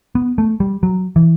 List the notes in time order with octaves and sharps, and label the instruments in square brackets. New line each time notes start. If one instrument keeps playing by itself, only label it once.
[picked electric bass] B3
A3
G3
F#3
E3